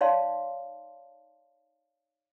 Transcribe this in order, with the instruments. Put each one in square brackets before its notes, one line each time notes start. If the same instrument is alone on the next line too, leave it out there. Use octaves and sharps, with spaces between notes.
[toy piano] D#4 C#5 D5 F5 A5 C6